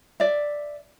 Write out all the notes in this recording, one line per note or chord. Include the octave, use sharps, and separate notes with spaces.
D5 E5